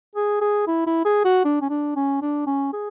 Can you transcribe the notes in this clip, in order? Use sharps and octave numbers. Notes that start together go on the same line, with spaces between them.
G#4
G#4
E4
E4
G#4
F#4
D4
C#4
D4
C#4
D4
C#4
G#4